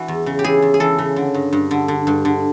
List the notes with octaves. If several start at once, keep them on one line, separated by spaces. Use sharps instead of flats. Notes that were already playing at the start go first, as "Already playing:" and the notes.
Already playing: E3 F#4
E2
C#3
G4
E3 G#4
E2
G#4
E3 A4
C#3
D3
G2
G2
D3
D3
G2
D3